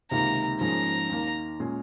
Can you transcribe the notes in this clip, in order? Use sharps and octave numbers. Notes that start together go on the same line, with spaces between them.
C#2 C3 D#3 A#3 A#5
G#2 F3 A#3 C#4 G#4 A#5
D#2 D#3 A#3
A#2 G#3 C#4 G#4